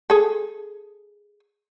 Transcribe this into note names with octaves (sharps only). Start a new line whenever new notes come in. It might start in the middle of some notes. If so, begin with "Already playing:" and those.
G#4 A4